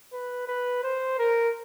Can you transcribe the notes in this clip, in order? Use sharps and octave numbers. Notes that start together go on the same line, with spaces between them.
B4
B4
C5
A#4